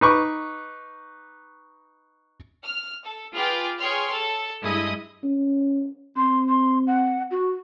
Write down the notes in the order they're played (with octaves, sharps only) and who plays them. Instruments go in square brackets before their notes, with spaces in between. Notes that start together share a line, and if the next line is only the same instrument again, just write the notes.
[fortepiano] D#4 B4 C#6 D6
[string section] F6
A4
F4 G#4 B4 G5 D6 F6
G#4 C#5 G5 C6 F6
A4
G2 G#3 E4 D#5 D#6
[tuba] C#4
[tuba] C4 [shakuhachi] C6
[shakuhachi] C6
F#5
F#4